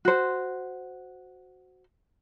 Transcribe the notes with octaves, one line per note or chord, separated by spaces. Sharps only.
F#4 C5